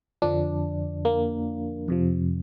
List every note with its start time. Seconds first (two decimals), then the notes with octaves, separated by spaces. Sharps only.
0.22 F2 D3 F3 D4
1.05 A#3
1.88 F2 C3 F3